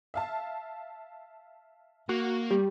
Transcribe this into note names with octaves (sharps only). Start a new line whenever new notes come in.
E5 F5 A5
A#3 F#4
G3 G4